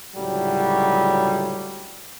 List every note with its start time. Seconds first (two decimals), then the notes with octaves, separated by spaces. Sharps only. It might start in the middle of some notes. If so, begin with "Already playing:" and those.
0.14 C#2 A2 D3 F#3 G3